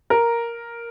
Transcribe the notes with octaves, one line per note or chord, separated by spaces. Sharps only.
A#4